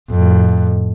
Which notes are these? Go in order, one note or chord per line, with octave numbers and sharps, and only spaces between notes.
F2 A2